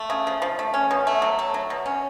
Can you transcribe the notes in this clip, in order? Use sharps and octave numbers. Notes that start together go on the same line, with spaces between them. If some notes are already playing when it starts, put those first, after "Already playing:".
Already playing: A3
C#3
F3
F3
A3
C#4
B2
A3
F#3
A3
F#3
B2
C#4